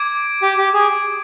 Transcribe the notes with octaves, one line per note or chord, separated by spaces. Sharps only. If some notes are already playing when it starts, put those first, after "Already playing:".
Already playing: D6 G#6 D7
G4
G4
G#4